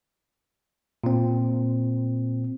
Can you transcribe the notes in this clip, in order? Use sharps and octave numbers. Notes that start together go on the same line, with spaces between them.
A#2 C4